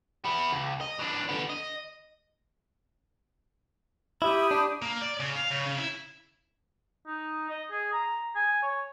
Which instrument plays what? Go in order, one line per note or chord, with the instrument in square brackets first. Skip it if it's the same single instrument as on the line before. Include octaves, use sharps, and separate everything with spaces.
[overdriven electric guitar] B3 E4
C#2
D#5
E3 D4
D3 B3
D#5
[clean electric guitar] E4 [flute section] G4 B5 D#6
[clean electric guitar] D4
[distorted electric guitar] A#3
D5
C#3
F5
C#3
C#3
E4
[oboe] D#4
D#5
G#4
A#5
G#5
C#5